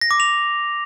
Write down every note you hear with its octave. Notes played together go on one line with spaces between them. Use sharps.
A#6
D6
F7